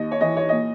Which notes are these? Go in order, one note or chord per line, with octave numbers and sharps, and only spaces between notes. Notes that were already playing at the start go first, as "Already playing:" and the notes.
Already playing: D#2 D#5
C#5
E3 D#5
C#5
A#2 D#5